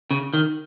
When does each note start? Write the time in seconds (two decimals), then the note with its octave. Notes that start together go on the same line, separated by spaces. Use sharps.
0.11 C#3
0.34 D#3